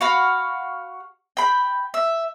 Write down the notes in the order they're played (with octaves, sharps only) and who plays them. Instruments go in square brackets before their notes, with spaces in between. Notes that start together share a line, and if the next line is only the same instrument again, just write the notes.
[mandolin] F#4 F5 B5
G5 B5
E5